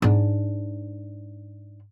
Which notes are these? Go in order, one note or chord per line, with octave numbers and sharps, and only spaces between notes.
G#2 D4